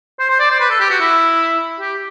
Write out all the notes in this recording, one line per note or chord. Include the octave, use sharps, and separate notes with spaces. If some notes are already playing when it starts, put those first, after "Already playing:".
C5
C5
D5
C5
B4
A4
G4
F#4
E4
G4